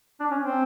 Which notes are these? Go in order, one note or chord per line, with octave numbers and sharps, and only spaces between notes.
D4
C#4
C4